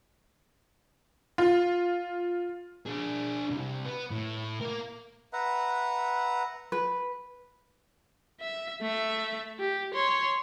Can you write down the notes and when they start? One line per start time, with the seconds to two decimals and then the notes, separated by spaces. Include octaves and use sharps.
1.38 F4
2.86 D4 G#4
3.51 C2 C3
3.85 B3
4.11 A2
4.61 A#3 A#4
5.33 B4 E5 F#5 A#5
6.72 B4
8.40 E5
8.81 A3 E5
9.59 G4
9.94 C#5 C6